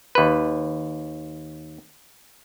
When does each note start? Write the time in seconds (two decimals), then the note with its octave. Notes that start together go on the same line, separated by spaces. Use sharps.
0.15 D#2 B4